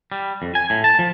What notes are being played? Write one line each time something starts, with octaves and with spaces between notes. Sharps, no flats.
G3
F2
G#5
A2
A5
F3